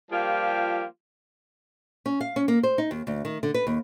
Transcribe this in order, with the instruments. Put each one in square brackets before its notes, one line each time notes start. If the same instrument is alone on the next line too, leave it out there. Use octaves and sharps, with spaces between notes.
[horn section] F3 G3 A#3 F4 G4
[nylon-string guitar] C#4
F5
C#4
A#3
C5
D#4
D#2
D2
D#3
D3
B4
D#2